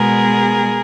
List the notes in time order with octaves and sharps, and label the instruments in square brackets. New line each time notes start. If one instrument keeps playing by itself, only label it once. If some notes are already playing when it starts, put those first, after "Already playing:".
Already playing: [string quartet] B2 G#3 B3 G#4 A#4